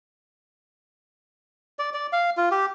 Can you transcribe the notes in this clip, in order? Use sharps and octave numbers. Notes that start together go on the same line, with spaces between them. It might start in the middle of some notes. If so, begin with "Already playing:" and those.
D5
D5
F5
F4
G4